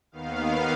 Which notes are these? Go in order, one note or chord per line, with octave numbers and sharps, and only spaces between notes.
D#2 D#3 B3 F5